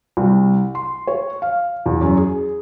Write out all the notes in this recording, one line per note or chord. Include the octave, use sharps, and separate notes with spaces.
C2
C6
C#5
F5
E2
F#2
G#4